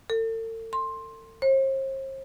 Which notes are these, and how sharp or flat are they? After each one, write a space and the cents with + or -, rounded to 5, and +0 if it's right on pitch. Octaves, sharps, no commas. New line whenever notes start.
A4 +40
C6 +15
C5 +40